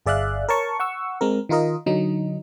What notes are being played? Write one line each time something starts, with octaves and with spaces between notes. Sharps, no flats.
G1 G#4 D5 E5 F5 F#6
A#4 C#5 A5 C#6
F#5 C#6 E6
G#3 C4 A#4
D#3 D#4 F4 A#4 D#5
D3 F#3 D#4